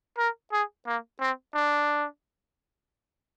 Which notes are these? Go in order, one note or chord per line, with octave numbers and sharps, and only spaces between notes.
A#4
G#4
A#3
C4
D4